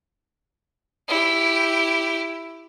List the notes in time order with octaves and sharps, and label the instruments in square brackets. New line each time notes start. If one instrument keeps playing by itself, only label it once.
[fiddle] E4 G4